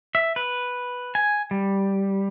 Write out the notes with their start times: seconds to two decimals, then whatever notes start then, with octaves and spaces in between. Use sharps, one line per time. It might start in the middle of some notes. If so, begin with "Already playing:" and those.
0.15 E5
0.36 B4
1.15 G#5
1.51 G3